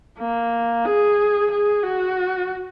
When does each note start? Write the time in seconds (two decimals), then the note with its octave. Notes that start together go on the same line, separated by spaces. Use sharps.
0.19 A#3
0.85 G#4
1.51 G#4
1.83 F#4